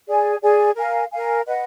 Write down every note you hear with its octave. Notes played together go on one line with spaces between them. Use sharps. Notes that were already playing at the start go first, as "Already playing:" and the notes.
G#4 D5 G#5
G#4 D5 G#5
A#4 F5 G#5
A#4 F5 G#5
B4 D#5 F#5